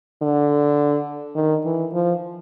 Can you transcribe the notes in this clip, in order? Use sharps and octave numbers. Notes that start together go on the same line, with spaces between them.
D3
D#3
E3
F3